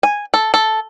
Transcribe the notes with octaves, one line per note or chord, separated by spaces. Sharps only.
G#5
A4
A4